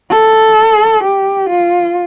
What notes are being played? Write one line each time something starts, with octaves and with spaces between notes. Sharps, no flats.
A4
G4
F4